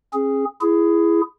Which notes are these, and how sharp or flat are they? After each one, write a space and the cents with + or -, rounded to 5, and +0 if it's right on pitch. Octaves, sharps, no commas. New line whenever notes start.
C#4 -40 G#4 +0
E4 +20 G#4 +0